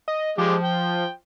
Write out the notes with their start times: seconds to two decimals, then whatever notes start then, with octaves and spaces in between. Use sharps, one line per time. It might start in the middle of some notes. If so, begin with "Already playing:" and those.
0.08 D#5
0.38 F3 G#3 G4
0.63 G5